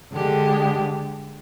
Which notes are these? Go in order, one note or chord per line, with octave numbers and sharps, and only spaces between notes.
D3 G#3 D4 G4